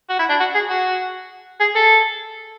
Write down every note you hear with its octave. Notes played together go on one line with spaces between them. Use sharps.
F#4
E4
D4
F#4
G#4
F#4
G#4
A4